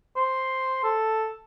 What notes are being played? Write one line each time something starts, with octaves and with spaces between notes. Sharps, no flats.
C5
A4